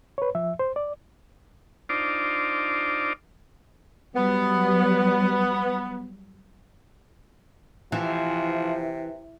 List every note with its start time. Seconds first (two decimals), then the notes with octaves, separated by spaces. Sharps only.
0.18 B4 C#5
0.35 F3 E5
0.59 C5
0.76 D5
1.89 D4 D#4 F4 C5 D5
4.15 F#3 G3 B3
7.92 C3 E3 F3